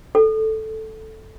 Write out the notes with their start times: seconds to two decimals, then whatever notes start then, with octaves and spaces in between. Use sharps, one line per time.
0.15 A4